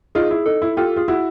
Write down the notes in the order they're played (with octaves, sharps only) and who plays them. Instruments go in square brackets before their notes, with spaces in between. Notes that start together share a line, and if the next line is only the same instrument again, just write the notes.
[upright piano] D#4 F4 [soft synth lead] G#4
[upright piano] E4
[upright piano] D#4 [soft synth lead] A4
[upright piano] E4
[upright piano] F4 G4 [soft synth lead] A4
[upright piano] F4 [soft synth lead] G#4
[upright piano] E4 F#4